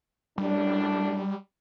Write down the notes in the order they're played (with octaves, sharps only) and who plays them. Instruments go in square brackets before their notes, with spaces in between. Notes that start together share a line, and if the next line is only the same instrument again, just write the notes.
[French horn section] F#2 A2 D4 [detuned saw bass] G3